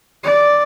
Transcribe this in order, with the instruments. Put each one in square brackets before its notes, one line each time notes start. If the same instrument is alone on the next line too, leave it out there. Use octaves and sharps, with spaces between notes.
[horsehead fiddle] D5